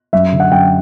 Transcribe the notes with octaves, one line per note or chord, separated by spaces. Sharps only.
F#2 E5
D3
F#5
F#2 G5